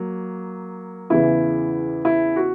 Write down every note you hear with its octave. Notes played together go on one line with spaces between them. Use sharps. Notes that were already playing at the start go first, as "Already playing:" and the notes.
Already playing: F#3 A#3
E2 C#3 E3 E4
E4
F#4